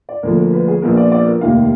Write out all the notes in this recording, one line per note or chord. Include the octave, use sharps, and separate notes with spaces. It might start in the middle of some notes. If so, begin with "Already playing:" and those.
D5
D2 D3 F3 A#3 A#4
A#4
B4
G#4
A#1 A#2 F3 B3 A#4
D5
D5
A#4
F1 D#2 D#3 A#3 F5